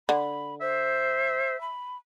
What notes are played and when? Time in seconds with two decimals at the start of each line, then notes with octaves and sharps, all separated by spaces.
0.09 D3 B5
0.61 C5 E5
1.61 B5